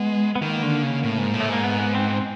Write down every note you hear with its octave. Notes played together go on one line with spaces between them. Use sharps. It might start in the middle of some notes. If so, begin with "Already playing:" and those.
Already playing: G#3 B3
B3
D#3 A#3
D3
C#3
A2
G#2
A2
A3
G#2 A#3
B3
B3
C4
C4